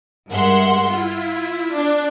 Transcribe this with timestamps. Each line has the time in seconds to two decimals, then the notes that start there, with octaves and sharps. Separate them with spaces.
0.30 G2 G#3 A#4 E5 F#5 C6
0.89 E4 F4
1.74 D4